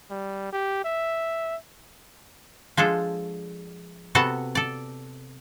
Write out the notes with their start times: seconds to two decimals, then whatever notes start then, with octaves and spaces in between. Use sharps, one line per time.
0.10 G3
0.52 G4
0.85 E5
2.77 F3 G#3 D4 A4
4.15 C3 B3 F#4 A4 F#5 A5
4.55 A4 D5